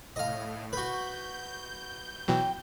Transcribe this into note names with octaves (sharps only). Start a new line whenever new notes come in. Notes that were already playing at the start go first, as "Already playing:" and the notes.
A2 D#5 F5
F#4 B4 G6
B2 E3 F#3 G5